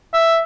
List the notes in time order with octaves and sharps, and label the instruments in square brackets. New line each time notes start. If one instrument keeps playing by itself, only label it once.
[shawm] E5